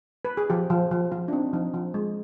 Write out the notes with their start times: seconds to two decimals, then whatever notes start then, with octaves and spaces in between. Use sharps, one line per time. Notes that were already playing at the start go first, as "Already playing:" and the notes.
0.25 B4
0.37 G#4
0.50 F3 G4
0.70 F3
0.91 F3
1.12 F3 F4
1.28 D4
1.32 C4 D#4
1.53 F3 D#4
1.74 F3
1.94 G#3